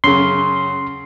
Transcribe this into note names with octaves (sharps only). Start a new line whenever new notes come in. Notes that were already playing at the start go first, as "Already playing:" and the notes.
F#2 C#3 C6